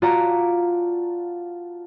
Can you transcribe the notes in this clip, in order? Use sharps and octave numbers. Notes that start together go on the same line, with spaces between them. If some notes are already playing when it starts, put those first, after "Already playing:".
F4 F#4 D5 A5 A#5